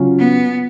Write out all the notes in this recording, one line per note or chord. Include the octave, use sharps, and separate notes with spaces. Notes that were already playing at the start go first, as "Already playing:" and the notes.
Already playing: C#3 F#3 C#4 F4
B3